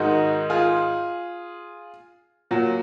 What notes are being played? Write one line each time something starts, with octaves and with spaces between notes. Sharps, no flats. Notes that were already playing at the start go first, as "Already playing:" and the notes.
Already playing: G#2 D#3 G#3 D#4 F#4
F4 G#4
A#2 F#3